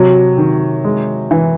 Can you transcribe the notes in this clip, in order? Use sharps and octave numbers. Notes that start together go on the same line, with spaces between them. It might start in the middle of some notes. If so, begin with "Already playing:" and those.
Already playing: C3 F#3
D#3
G#3
E3